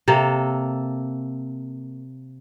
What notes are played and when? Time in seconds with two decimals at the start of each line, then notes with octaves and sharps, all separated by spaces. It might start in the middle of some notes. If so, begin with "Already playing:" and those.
0.08 C3 A#3 A4